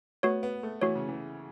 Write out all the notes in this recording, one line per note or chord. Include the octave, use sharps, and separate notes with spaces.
A3 B3 F#4 C#5
B3
A3
E3 A3 F#4 C#5
C#3
E3